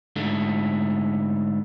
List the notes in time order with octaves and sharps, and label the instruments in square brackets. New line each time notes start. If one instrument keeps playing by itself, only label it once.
[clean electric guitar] G#2 D3 A3